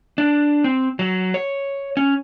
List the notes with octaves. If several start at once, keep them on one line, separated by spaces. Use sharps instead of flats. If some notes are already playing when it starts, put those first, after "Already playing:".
D4
C4
F#3
C#5
C#4